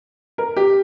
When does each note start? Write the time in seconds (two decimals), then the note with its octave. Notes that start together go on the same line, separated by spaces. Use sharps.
0.38 A#4
0.57 G4